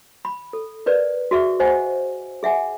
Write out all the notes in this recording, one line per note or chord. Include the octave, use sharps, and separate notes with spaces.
B5
A4
A#4 B4 D5
F#4 G#4 E5 C#6
C5 D#5 F#5 G#5
G#4 E5 F#5 G#5